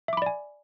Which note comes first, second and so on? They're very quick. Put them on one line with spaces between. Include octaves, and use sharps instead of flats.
E5 D6 B5 D5 G#5